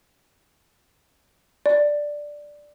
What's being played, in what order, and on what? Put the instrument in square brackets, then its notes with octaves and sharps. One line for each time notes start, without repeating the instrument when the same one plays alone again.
[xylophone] D5